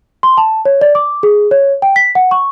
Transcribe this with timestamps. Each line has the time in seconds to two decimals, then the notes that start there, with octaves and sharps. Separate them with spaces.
0.23 C6
0.38 A5
0.65 C#5
0.81 D5
0.95 D6
1.23 G#4
1.51 C#5
1.82 G5
1.96 B6
2.15 F#5
2.31 C#6